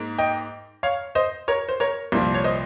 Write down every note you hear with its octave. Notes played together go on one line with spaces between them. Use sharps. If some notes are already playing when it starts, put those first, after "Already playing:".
Already playing: G#2 A#3
D#5 G5
C#5 F5
C5 D#5
A#4 C#5
C5
A#4 C#5
C2 A#2 F3 A#3
C#5
C5 D#5